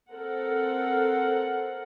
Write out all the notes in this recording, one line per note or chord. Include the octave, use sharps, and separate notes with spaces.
C4 A4 A#4 C5 F#5